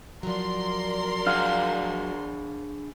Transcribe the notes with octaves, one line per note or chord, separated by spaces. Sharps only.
F3 F#3 A#4 D5 C6
D4 G#4 F5 F#5 F6 F#6